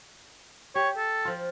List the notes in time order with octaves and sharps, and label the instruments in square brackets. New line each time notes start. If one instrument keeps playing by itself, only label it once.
[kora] G4 [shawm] C#5
[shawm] A4
[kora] F3 F4